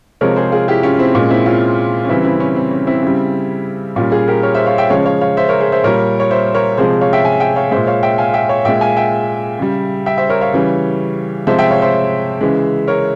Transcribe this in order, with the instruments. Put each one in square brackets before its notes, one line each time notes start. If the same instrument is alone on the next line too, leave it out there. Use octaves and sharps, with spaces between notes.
[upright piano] C3 F3 G#3 A#4 C#5
G#4 C5
F4 G#4
E4 G4
C#4 F4
C4 E4
A#2 G#3 C#4
C4 E4
C#4 F4
C#4
C#3 E3 G3 C4 E4
C4 E4
C#4
C4
C#4
C4 E4
C#3 G3
A#2 G3 C#4 F4
F4 G#4
G4 A#4
A#4 C#5
C5 E5
C#5 F5
E5 G5
C#3 F3 G#3 C#5 F5
C#5 F5
C#5 F5
C5 E5
A#4 C#5
G#4 C5
C5 E5
A#2 G3 A#4 C#5
C#5
C5 E5
A#4 C#5
C3 F3 G#3 G#4 C5
C#5 F5
E5 G5
F5 G#5
E5 G5
C#5 F5
A#2 G#3 C5 E5
C#5 F5
E5 G5
F5 G#5
E5 G5
C#5 F5
A#2 G#3 E5 G5
F5 G#5
E5 G5
C#3 G3
E5 G5
C5 E5
A#4 C#5
C#5 F5
C#3 E3 G3
C3 F3 G#3 C5 E5
E5 G5
C#5 F5
C5 E5
C#3 E3 G#3
A#4 C#5